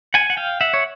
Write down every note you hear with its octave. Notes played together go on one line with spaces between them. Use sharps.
F#5 G#5
F#5
F5 G5
E5 F#5
C#5